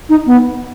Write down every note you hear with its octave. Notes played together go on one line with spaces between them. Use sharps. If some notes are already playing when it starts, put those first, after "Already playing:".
D#4
B3